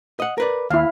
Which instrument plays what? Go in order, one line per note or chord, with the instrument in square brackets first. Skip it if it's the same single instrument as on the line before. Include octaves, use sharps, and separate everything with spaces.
[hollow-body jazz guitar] D#5 F#5
A#4 B4 D5
[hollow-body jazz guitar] D#2 [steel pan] E4 F5